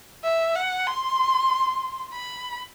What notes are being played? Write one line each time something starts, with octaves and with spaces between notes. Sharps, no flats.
E5
F#5
C6
B5